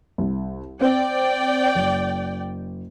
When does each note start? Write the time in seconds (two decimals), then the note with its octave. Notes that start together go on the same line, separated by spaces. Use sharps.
0.18 C2
0.81 C4 D5 G5
1.75 F#1